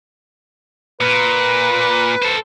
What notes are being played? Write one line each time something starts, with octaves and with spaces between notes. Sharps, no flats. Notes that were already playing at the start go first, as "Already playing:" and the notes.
A#2 B4
A4 C5